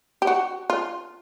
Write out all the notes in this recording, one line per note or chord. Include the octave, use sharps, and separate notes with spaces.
G4
F#4
F4